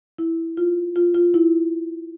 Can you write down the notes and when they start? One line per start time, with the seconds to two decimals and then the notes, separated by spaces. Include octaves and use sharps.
0.19 E4
0.57 F4
0.96 F4
1.14 F4
1.34 E4